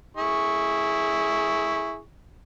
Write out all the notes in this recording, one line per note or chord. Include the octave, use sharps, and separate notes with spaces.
E4 G#4 C#6